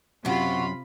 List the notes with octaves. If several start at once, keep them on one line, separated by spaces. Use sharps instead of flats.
F#2 C3 C4 F4 F#4 B5